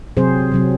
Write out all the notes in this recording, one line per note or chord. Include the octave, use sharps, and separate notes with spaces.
C3 F#3 C4 G#4 C5
C3 F#3 C4